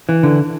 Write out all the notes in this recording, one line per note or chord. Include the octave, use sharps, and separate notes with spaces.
E3
D3